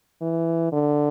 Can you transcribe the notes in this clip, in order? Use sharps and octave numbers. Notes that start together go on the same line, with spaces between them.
E3
D3